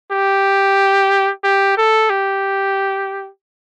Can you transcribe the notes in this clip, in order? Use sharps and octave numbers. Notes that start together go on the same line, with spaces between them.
G4
G4
A4
G4